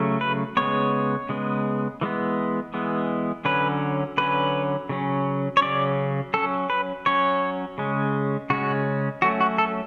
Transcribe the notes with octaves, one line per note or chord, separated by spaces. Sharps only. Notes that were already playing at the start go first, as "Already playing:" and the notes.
Already playing: C#3 F#3 A3 C#4
B4
C#3 G#3 B3 C#5
C#3 G#3 B3
E3 G#3 B3
E3 G#3 B3
D3 F#3 C#4 B4
D3 F#3 C#4 B4
C#3 F#3 C#4
C#5
C#3 F#3 C#4 D5
F#3 C#4 A4
B4
F#3 C#4 C#5
C#3 G#3 C#4
C#3 G#3 C#4 F#4
F#3 A3 C#4 F#4
F#4
A4